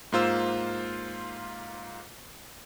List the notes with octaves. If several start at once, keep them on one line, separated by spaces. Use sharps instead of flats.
G#2 A#3 F4 C5 E6 E7